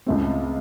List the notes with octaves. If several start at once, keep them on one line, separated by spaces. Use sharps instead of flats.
C#2 C#3 A3 C4